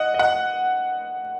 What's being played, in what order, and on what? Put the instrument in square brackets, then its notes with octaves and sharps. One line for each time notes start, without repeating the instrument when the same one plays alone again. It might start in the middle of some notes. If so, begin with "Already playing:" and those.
Already playing: [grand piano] D#5 F#5
D#5
F#5